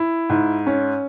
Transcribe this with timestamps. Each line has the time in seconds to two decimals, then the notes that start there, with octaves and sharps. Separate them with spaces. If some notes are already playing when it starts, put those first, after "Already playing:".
Already playing: E4
0.29 G#2
0.67 C#4